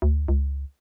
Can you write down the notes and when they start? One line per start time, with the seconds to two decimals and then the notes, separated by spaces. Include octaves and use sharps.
0.02 D2
0.28 C#2